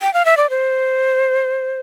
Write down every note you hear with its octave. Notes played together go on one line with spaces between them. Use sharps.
G5
F5
E5
D5
C5